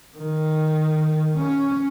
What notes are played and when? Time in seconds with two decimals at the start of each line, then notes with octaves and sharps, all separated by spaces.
0.17 D#3
1.38 C#4